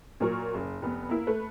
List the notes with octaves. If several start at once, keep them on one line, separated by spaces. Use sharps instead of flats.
A#2 F#3 A#4 C#6
F#1
F1 B3
A#3 E4
A3 B4